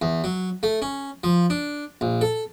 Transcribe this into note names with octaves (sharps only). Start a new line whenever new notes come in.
E2
F#3
A3
C#4
F3
D4
A#1
A4